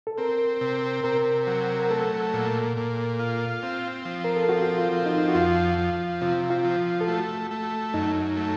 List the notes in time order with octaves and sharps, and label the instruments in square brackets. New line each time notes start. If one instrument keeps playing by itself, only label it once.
[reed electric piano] A4
[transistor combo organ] C4 [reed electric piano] A#4
[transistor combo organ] C3
[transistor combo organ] C3 [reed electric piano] A#4
[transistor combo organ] F#3
[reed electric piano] A#4
[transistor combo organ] A3 [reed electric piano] A4
[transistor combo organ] A#2
A#2
F4
C4
F3
[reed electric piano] A#4
A4
[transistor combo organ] C4 [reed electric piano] F#4
[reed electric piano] F4
[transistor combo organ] F3
[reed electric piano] D#4
F#4
[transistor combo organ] F2 [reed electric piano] F4
[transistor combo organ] F3
[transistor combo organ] C3 [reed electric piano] F4
[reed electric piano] F4
[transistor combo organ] F3
[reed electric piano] A4
[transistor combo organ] A3 [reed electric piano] F#4
[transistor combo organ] A3
[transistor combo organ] F#2 [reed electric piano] D#4
[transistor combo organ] A3